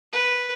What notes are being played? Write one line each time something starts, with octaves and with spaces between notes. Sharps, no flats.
B4